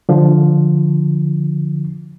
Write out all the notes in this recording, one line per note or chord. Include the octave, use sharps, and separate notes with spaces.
D3 F3